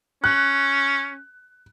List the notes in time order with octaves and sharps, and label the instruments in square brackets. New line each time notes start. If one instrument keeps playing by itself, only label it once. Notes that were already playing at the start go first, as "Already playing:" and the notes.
[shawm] C#4 [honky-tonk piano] F#6